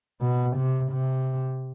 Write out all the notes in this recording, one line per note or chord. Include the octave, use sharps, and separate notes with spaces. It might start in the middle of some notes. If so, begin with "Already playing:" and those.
B2
C3
C3